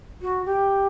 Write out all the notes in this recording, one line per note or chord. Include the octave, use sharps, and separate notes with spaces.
F#4
G4